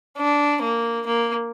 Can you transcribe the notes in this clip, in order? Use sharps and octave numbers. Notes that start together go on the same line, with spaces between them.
D4
A#3
A#3